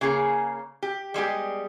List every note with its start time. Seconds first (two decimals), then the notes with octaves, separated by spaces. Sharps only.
0.01 C#3 A#3 G#4 C#5
0.82 G4
1.14 G3 G#3 B3 G4